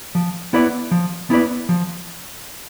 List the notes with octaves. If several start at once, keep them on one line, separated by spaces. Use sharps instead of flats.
F3
B3 E4 B4 D5
F3
B3 E4 B4 D5
F3